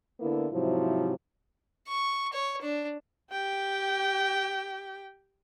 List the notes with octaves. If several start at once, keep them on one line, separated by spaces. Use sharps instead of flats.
D3 A#3 B3 E4
G#2 C3 F3 F#3 E4
C#6
C#5
D4
G4 G5